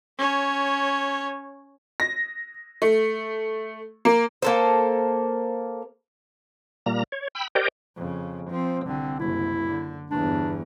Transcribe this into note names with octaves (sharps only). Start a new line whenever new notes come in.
C#4 C#5
A#6
A3
A#3
A#3 A4 C5
A#2 G3 A#3 A#5
C#5
G5 B5 E6
G4 A#4 C5 D5 D#5 G5
F2 C#3
F3 C4
C2 D3 C4
F#1 C2 E4
D3
G1 E2 D4